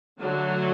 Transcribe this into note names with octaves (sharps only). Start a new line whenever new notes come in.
D3 F#3 A3